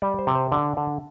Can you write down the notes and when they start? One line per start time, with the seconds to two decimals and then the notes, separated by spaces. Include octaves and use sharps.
0.02 G3 D5
0.19 C5
0.27 C3
0.35 C5
0.52 D3 D5
0.77 D3